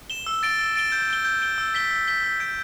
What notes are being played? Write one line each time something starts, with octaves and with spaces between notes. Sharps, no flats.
E7 G7
E6
A6 D7 G7
E6
A6 D7 G7
G6
D7 G7
G6
D7 G7
E6
B6 G7
E6
B6 G7
E6
G6 D7